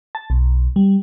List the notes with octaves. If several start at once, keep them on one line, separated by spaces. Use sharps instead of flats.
A5
B1
G3